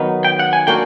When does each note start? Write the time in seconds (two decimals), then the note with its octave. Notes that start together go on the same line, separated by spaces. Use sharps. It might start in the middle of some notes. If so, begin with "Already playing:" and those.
Already playing: D#3 F#3 B3 D#4
0.25 G5
0.39 F#5
0.53 G#5
0.67 A#3 D4 F#4 G5